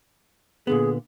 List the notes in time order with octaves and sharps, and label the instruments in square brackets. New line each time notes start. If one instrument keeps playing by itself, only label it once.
[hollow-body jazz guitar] A#2 D3 B3 [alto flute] G#4